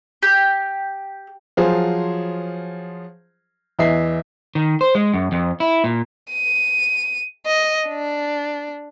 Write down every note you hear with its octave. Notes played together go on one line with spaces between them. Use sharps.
G4
F3 F#3 F4 G#4 C5
E2 E3 D#5 E5 C7
D#3
C5
G#3
F#2
F2
E4
A#2
D#7
D#5
D4